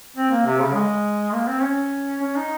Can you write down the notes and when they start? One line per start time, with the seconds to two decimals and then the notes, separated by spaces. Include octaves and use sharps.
0.16 C4
0.31 A#3
0.46 C3
0.60 C#3
0.74 G#3
1.34 A#3
1.48 C4
1.62 C#4
2.22 C#4
2.37 D#4